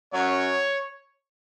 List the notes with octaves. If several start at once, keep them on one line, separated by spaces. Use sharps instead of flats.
F#2 F#3 C#5